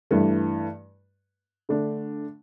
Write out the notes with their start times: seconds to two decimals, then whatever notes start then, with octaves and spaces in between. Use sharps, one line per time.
0.11 G2 E3 A3
1.69 D3 A3 D4